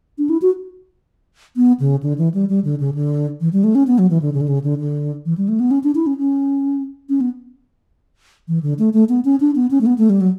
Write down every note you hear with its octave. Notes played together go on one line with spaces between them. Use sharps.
D4
E4
F#4
B3
C#3
D3
E3
G3
G3
D3
C#3
D3
E3
G3
A3
C#4
B3
F#3
E3
D3
C#3
D3
C#3
D3
D3
E3
G3
A3
B3
C#4
D4
E4
C#4
C#4
C#4
B3
E3
D3
A3
A3
B3
C#4
D4
B3
C#4
A3
B3
A3
G3
F#3